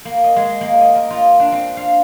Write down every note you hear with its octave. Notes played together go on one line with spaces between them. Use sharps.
A#3
D#5
G#3
A#3
D#5
A#4
F4
D4
C4
F5